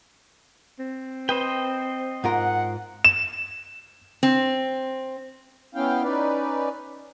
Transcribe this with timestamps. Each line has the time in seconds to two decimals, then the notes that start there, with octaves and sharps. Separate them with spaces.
0.79 C4
1.29 B4 C5 D#5 G5
2.24 G#2 F4 A#4 F#5
3.05 E7
4.23 C4
5.75 B3 C#4 E4 F5 G5
6.03 C#4 D#4 B4 D5